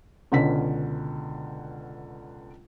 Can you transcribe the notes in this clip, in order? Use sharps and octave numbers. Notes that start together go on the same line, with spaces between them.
C#2 B2 D3 C#4 B6